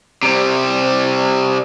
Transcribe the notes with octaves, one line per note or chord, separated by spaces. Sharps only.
C3 G3